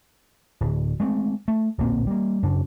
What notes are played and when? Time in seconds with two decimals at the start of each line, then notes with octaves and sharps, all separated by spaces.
0.61 D1
1.00 G#3 A3 C4
1.48 A3
1.78 D1 A#1 A#3 C4
2.07 G3 A#3
2.43 F#2 C#3 D4